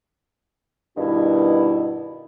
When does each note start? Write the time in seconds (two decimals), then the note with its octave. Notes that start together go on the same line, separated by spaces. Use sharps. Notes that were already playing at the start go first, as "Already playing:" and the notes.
0.97 G2 B2 D#3 E4